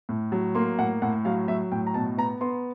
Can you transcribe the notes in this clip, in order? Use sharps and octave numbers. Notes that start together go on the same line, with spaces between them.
A2
F#3
A#3 C6
A2 F#5
A2 F#5
F#3 F5
F#3 E5
A2 G5
A#5
B2 A5
B3 A#5
B3 C6